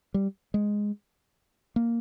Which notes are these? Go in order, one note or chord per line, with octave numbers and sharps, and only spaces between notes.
G3
G#3
A#3